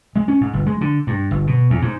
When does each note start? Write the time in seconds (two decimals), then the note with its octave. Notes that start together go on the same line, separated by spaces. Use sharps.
0.16 G#3
0.28 C#4
0.41 G#2
0.53 G1
0.66 G#3
0.81 D3
1.07 G2
1.31 G1
1.47 B2
1.70 E2
1.82 G#2